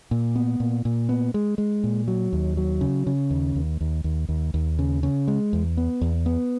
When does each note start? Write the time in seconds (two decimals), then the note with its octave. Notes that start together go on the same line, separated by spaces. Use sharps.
0.11 A#2
0.36 B3
0.60 A#2
0.85 A#2
1.09 B3
1.34 G#3
1.58 G#3
1.84 A#2
2.08 F#3
2.33 D#2
2.57 F#3
2.81 C#3
3.07 C#3
3.30 D#2
3.56 D#2
3.81 D#2
4.04 D#2
4.29 D#2
4.54 D#2
4.79 C#3
5.03 C#3
5.28 G#3
5.53 E2
5.77 B3
6.01 E2
6.26 B3